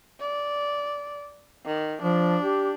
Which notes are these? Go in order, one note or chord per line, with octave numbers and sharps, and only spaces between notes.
D5
D#3
F3 D4
G4